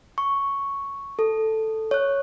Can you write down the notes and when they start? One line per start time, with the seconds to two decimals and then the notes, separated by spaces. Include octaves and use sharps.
0.18 C#6
1.19 A4
1.91 C#5 F#6